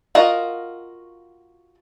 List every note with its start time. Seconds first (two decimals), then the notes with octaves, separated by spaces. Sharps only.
0.15 F4 F#4 A#4 D#5